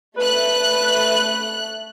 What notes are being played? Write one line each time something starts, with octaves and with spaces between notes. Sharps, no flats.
A3 B4 F#6